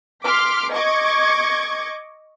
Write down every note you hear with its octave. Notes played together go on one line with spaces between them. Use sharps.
C6 D6 F6 B6
D#5 C#6 D6 G#6